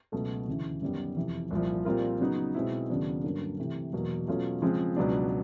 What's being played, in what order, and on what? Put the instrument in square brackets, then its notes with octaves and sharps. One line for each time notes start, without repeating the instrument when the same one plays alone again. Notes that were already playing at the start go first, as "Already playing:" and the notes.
[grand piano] C#2 B2 F#3 A3
D2 C#3 E3
F#2 D#3 G3 B3
F2 C3 E3
C2 A#2 F3
A#2 G3 C4 F4 A#4
C#3 F#3 B3 D#4
B2 G#3 C4 E4
D#2 C#3 F#3 B3 D4
G2 D3 F#3 A#3 C#4
C3 E3 A3
E2 B2 F#3 A#3
B2 F#3 A3 C#4 F4
C#3 F3 G#3 C4 F4
C#2 B2 F#3 B3 D4